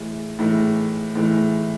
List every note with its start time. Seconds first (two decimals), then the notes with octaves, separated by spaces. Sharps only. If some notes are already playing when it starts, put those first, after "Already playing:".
Already playing: A2 E3 G#3
0.39 A2 E3 G#3
1.15 A2 E3 G#3